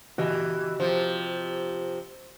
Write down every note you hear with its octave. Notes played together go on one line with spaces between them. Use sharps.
E3 F#4 G4 D#5
C3 F3